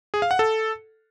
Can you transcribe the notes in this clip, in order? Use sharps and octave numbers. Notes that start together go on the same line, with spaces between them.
G#4
F5
F#5
A4